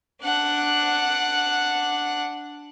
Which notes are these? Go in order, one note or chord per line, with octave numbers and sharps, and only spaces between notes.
D4 F#5